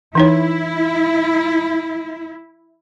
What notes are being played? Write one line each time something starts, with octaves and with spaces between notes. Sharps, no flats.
E3 D#4 E4 C#5